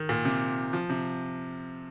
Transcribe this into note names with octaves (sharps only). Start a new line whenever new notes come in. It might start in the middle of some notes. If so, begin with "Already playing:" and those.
Already playing: D#3
A#2
C3
F3
C3